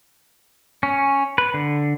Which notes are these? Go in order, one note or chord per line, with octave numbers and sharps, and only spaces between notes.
C#4
B4
D3